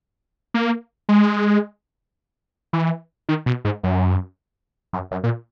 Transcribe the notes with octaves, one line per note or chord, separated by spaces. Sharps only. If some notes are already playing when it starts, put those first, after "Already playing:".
A#3
G#3
E3
D#3
B2
G#2
F#2
F#2
F#2
A#2